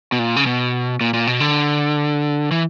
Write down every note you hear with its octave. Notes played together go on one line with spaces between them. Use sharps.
B2
A#2
C#3
B2
A#2
A#2
B2
D3
E3